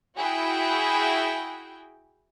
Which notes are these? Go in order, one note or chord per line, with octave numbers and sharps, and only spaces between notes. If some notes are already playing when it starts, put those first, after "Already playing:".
E4 F#4 G#4 G5